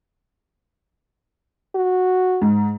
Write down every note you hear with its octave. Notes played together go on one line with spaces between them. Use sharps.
F#4
G#2